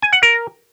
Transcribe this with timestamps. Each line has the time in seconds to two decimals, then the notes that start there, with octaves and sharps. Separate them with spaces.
0.02 G#5
0.13 F#5
0.23 A#4